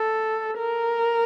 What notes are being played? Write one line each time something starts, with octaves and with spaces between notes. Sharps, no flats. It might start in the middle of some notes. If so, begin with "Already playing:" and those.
Already playing: A4
A#4